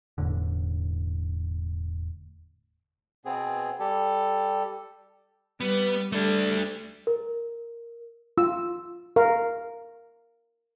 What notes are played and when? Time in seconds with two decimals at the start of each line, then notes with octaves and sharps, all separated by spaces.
0.18 E1 E2 A2 D3
3.25 B2 B3 C4 G#4
3.80 G3 G4 A4
5.60 G3 B3
6.12 G3 A3 D4 A4
7.07 A#4
8.38 F4 E6
9.16 A#4 F5